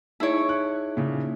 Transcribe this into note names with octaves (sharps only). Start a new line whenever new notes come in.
D#4 E4 G#4 C#5 D7
F#6
A#2 C#3